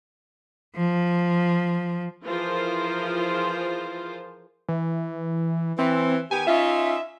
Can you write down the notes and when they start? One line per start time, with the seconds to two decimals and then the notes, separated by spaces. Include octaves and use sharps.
0.76 F3
2.24 E3 F3 F4 G#4 A#4 C5
4.69 E3
5.79 E3 C4
6.31 D#3 B3 G4 G#5
6.47 C#4 D#4 F4 E5